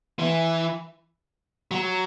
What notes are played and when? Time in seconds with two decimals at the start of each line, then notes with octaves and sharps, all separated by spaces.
0.19 E3
1.71 F#3